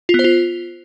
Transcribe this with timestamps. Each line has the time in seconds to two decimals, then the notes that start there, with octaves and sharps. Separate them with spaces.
0.09 F4
0.14 B3
0.19 C5
0.24 F4